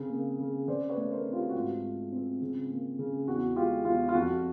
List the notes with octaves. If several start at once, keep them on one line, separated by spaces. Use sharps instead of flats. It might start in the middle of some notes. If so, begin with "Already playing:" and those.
Already playing: C#3 C4
A#3
C#3
C#3 C5 D5
B4 C#5
A3
A#4 C5
C4
F4 G4
F#4
G#2 F4
G#3
C4
C#3
A#3
C#3
E2 F#4
G#3 F4 G4
E2 F4
F4
F2 F#4